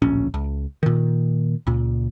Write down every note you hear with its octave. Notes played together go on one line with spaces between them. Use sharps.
D1 A#1 C#4
C#2
A#2 D#3
C#2 A#2